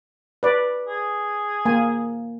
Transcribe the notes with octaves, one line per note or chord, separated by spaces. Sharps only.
B4 D5
G#4
A#3 G#5